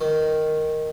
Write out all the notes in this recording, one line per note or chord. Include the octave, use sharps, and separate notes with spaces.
D#3